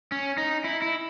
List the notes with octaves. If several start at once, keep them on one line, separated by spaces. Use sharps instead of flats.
C#4
D#4
E4
E4